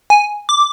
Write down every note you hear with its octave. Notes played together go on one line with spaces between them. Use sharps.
G#5
D6